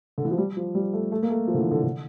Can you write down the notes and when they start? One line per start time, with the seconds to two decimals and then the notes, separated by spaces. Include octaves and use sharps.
0.18 D3
0.25 E3
0.31 F3
0.38 G3
0.57 F3
0.75 G3
0.93 A3
1.12 A3
1.22 A#3
1.30 A3
1.48 F3
1.54 D3
1.59 E3
1.71 D3
1.83 D3